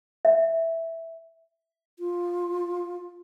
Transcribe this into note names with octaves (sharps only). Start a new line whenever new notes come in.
E5
F4